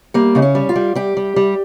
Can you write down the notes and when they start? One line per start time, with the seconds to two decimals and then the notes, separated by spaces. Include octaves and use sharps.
0.14 G3 A#3
0.35 C#3 D#4
0.42 C#4
0.55 G3
0.69 F4
0.76 G3
0.95 G3 G4
1.17 G3
1.36 G3